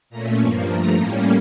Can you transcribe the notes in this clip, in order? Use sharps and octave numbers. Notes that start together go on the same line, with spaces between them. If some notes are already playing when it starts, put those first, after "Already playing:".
A#2 A3 C#4 A#5
G2 F3 A#3 C#6
G2 F3 A3 A#5
A2 G3 A#3 C#4